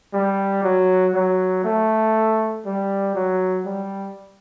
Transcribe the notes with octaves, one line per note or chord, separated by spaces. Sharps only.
G3
F#3
F#3
A3
G3
F#3
G3